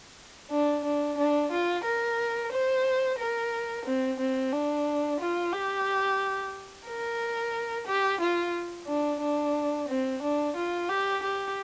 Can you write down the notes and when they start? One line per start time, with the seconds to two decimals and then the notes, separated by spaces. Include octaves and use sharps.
0.50 D4
0.85 D4
1.18 D4
1.51 F4
1.85 A#4
2.52 C5
3.19 A#4
3.85 C4
4.19 C4
4.53 D4
5.20 F4
5.53 G4
6.87 A#4
7.87 G4
8.20 F4
8.87 D4
9.21 D4
9.89 C4
10.22 D4
10.56 F4
10.89 G4
11.23 G4